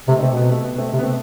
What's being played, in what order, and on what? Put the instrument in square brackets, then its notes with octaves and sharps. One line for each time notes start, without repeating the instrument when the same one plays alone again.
[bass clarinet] C3 [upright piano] A3 C4
[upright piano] D#4
A3 C4
[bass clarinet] B2
[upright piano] B3
A3
B3
A3 C4
[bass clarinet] C3
[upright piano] B3
A3 C4